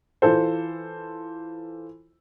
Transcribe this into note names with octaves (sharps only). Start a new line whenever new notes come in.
E3 F4 A4 C5